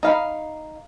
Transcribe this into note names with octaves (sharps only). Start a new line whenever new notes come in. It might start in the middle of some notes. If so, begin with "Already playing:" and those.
D#4 F5 B5